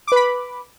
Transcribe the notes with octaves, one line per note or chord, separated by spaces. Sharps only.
B4 B5 D6